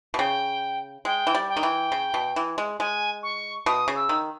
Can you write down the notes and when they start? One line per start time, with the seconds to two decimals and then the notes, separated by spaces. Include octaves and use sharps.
0.14 B2
0.18 C#3 G5
1.05 G#3 G5
1.27 E3
1.35 G3
1.48 G5
1.57 D#3
1.63 E3
1.92 C#3
2.14 B2
2.36 E3
2.58 G#3
2.80 G#3 G#5
3.23 C#6
3.66 B2 D#6
3.88 C#3
3.96 E6
4.09 D#3